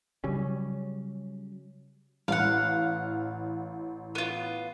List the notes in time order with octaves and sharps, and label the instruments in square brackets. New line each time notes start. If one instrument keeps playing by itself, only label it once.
[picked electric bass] C#3 F#3 G3 C#4
[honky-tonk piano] A1 [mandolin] F5 F#5
[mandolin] B3 F4